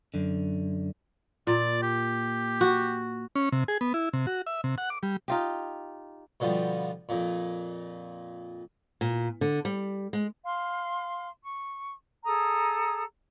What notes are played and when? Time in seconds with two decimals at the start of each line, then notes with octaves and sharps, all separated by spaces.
0.14 F#2 D3
1.47 A#2 D5
1.83 G4
2.61 F#4
3.35 C#4
3.52 C3
3.68 G#4
3.81 B3
3.94 E4
4.13 C3
4.27 F#4
4.47 E5
4.64 C3
4.78 F#5
4.90 D6
5.03 G3
5.28 D#4 F4 G4
6.40 B2 D3 F3 G3
7.09 F2 A#2
9.01 A#2
9.41 D3
9.65 G3
10.13 G#3
10.45 F5 C6
11.43 C#6
12.25 G#4 A4 A#5 D#6